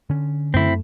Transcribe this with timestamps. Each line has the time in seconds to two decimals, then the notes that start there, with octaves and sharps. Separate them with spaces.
0.10 D3 C#4
0.54 F#2 A3 C4 E4